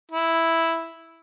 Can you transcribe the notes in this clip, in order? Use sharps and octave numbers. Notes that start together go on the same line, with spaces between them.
E4